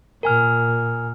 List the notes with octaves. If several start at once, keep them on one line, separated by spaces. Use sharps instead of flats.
A#2 A#4 G#5 F6